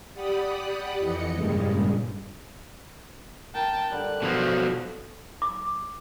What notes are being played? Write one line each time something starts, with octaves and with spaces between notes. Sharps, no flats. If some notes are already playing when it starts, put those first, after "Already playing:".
G4 D5 F#5 B5 D#6 F#6
F2 E3 D#5 C#7
G2 A#2 C#3 G3 G#3
A#4 G5 A5
D3 G3 G4 F#6
B2 F3 F#3
D6